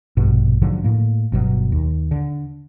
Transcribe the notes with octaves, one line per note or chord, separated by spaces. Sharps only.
A#1 G2 B2
G#2 D3 F3 F#3
A2 A#3
G1 B2 F#3
D#2
D3